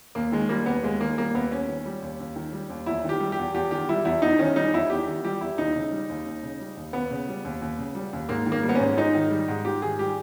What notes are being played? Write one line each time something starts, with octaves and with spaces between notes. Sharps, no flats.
D#2 A#3
D#3 G#3
G3 A#3
D#2 B3
D#2 G#3
D#3 A#3
G3 A#3
D#2 B3
D#2 C#4
D#3
G3
D#2
D#2
D#3
G3
D#2
E2 E4
D#3 G4
G3
G4
E2
E2 G4
D#3 G4
G3 E4
E2 E4
E2 D#4
D#3 C#4
G3 D#4
E2 E4
E2 G4
D#3
G3 G4
E2 E4
D#2 D#4
C#3
G3
D#2
D#2
C#3
G3
D#2
D#2 B3
C#3
G3
D#2
D#2
C#3
G3
D#2
G#2 A#3
D#3
A#3
G3
B3
G#2 C#4
G#2 D#4
D#3
G3
G#2
G#2 G4
D#3 G#4
G3 G4